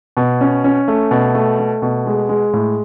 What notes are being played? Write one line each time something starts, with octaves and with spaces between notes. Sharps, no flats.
B2
C#4
C#4
A3
B2
A3
A3
B2
G#3
G#3
A2